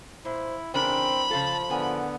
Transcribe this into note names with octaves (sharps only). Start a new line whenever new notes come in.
A#2 E4 C5
C#3 E3 C4 D4 A#4 B5
C#3 F3 F4 A4 A5
A2 D3 B3 A#4 G#5